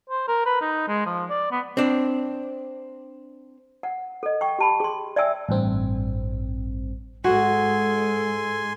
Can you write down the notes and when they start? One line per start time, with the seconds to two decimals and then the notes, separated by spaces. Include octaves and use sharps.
0.10 C5
0.28 A#4
0.46 B4
0.62 D#4
0.88 G#3
1.06 F3
1.30 D5
1.52 B3
1.77 C4 D4
3.83 F#5
4.23 A4 D#5
4.41 G5 C#6
4.59 G4 A5 B5
4.80 G#4 C6
5.16 D5 E5 G5 G#5 E6
5.49 A1 G2 C4
7.24 G#2 G#3 F#4 A4 G#5 C6